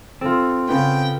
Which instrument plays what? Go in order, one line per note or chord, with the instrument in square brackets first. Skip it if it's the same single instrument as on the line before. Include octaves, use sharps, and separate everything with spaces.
[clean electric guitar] C4 [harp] F4 A4
[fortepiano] C#3 B3 [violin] G5